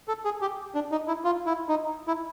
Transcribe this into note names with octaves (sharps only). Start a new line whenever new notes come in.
A4
G#4
G4
D4
D#4
E4
F4
E4
D#4
E4